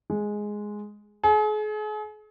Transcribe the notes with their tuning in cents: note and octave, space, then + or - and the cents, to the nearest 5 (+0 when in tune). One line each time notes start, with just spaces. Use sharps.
G#3 +0
G#4 +40